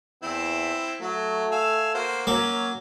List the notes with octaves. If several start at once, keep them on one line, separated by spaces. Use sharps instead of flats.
E2 C4 E4
F#3 A3
F5 G#5 E6
A#3 F#4 C5
F#3 A#3 C#4